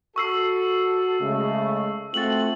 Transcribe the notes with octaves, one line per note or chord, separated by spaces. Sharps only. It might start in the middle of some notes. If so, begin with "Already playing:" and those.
F#4 A4 C#6 E6 C7
C#3 G#3 A3 D#5
A3 C4 F4 F#4 A6 F#7